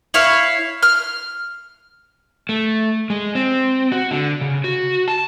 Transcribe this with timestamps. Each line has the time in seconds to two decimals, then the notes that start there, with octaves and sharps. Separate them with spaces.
0.14 E4 C#5 F5
0.83 F6
2.49 A3
3.10 G#3
3.35 C4
3.92 F#4
4.11 D3
4.41 C#3
4.64 F#4
5.08 A5